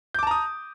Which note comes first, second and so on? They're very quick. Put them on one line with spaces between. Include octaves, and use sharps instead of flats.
G6 D6 A5 A#5 D#6